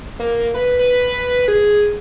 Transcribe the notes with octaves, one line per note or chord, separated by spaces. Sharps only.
A#3
B4
B4
G#4